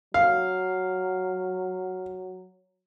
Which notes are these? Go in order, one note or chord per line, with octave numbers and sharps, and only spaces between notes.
F#3 F5